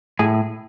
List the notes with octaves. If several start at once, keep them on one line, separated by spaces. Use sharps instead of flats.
A2 G#4